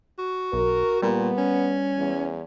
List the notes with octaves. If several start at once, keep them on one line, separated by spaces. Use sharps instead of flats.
F#4
B1 A#4
A#2 G3 B3
C#4
E2